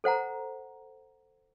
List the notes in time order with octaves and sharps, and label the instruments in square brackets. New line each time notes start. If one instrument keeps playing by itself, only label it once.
[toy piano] A4 C5 F#5 A#5